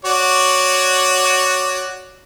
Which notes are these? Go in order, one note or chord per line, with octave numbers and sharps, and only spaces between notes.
F#4 C#5 D5